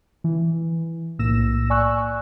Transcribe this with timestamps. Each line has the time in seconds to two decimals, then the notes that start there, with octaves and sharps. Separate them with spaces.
0.24 E3
1.19 B1 A2 A#3 E6 A#6 E7
1.70 D5 G#5 C#6 E6 F#6